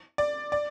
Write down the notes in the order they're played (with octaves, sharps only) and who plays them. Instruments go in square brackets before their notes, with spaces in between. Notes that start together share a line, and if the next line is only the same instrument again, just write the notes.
[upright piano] D5
D5